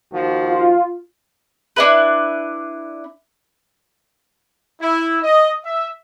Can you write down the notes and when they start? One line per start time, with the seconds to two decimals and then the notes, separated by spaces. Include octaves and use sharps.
0.12 D#2 F3 F#4
0.48 F4
1.76 D4 E4 B4
4.80 E4
5.21 D#5
5.64 E5